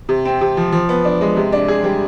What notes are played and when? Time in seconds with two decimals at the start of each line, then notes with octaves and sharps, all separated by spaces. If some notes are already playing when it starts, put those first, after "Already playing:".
0.09 C3
0.25 C4
0.41 C3
0.57 F3
0.72 F3
0.89 B3
1.05 D4
1.21 G#3
1.37 C3
1.52 D4
1.68 G#4
1.84 G3